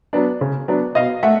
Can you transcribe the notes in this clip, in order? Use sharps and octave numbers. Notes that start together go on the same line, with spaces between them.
F#3 B3 D4
C#3
F#3 B3 D4
B2 D#5 F5
A3 E5 F#5